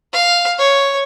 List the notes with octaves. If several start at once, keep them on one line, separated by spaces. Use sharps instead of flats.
F5
C#5